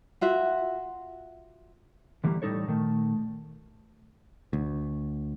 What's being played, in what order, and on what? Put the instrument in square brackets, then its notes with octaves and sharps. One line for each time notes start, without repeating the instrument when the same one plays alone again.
[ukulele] F4 F#4 E5
[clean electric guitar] D2 E3 G3 A#3
A2 G3 D#4 A4 C#5
A#2 D#3 A3
[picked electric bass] D2